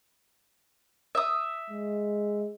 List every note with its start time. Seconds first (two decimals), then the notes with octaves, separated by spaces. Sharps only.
1.15 E5 D#6
1.70 G#3